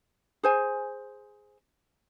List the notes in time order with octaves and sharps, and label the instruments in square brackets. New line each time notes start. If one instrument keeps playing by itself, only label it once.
[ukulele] G#4 C5 G#5